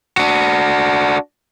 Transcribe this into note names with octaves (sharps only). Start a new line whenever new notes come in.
D4 F#4